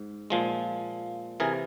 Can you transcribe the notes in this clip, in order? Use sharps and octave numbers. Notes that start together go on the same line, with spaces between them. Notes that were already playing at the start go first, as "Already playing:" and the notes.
Already playing: G#2
A#2 F3 G#3
C3 E3 G#4 A#4